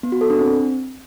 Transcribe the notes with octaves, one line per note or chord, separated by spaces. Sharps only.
B3
F#4
A4
D4
C4